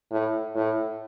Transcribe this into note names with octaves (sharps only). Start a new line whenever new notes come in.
A2
A2